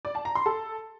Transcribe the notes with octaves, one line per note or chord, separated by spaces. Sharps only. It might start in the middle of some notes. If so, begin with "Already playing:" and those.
D5
A5
A#5
C6
A4